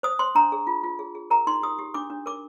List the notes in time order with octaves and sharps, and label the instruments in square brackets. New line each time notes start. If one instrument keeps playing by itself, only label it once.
[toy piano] C5 D#6
C5 C6
D4 A#5
G#4
F4
F4
G#4
G#4
A#4 A#5
D#4 C6
G4 D#6
G4
D4 D6
D4
A#4 D6